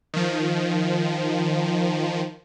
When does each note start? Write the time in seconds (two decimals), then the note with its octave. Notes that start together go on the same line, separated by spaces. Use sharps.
0.14 D#3 F3